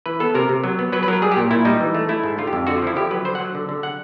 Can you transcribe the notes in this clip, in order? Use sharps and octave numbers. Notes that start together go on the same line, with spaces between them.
E3 B4
B3 A4
C3 A#4
C3
F#3
B3
F#3 B4
B4
F#3 A#4
G3 G#4
G4
A#2
A#2 E4
G3 D#4
E3
A3
A3 E4
G#2
D3 F4
G4
F2
D3 F#4
F4
F3 E4
D3 G4
F#3 B4
D3 C5
F#5
F#3
D3
D3
F#5